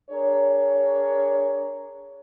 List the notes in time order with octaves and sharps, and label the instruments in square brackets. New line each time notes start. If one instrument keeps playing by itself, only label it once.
[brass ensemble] D4 G#4 A#4 C#5